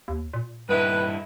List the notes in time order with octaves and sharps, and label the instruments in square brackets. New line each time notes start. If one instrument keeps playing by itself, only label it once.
[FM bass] D#2
A#2
[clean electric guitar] G2 D#4 E4 [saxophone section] B4